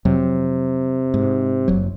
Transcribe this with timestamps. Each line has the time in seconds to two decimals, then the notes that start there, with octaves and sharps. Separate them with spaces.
0.05 F2 C3 F#3
1.14 G#2
1.68 F#1 F#3